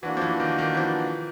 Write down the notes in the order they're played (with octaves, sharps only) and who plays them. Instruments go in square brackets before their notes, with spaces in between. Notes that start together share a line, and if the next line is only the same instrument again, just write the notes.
[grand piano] E3 [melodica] A#3 D4 F#4
[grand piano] F3
E3
D#3
D#3
E3
F3